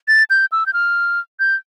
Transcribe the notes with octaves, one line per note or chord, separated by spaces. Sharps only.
A6
G6
E6
G6
F6
G6